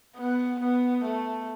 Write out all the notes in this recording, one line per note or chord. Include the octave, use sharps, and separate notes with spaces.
B3
B3
A3